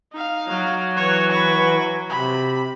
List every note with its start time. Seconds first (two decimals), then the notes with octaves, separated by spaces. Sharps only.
0.13 D#4 F5
0.48 F#3
0.97 E3 C#5
1.32 B5 C#6
2.10 C3 B5